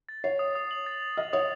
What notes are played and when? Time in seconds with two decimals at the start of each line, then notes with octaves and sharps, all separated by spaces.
0.09 A6
0.24 C#5 C7
0.39 D#6
0.55 D#6
0.71 F#7
0.86 A6
1.02 A6
1.17 D#5 D#6
1.33 C#5 D#6